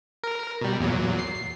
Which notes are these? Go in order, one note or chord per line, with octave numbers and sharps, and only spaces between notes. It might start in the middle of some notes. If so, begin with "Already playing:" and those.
A#4
B2 G3
E2 A#2 F#3
C7